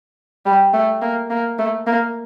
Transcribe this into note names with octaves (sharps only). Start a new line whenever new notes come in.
G3
A3
A#3
A#3
A3
A#3